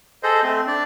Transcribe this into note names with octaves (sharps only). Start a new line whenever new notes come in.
G#4 A4 C5 D#5
A3 C4
D4 D5